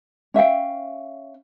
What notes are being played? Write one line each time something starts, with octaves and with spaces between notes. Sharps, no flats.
C#4 E5 F5 G5